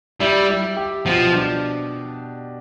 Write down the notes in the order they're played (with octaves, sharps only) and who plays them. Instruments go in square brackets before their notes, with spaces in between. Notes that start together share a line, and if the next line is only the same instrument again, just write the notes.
[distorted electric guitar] G3 [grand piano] E4
[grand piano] E4
G4
[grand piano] B2 [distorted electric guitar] F3
[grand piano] D4